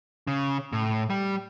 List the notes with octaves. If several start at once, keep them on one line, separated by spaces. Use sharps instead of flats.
C#3
A2
G3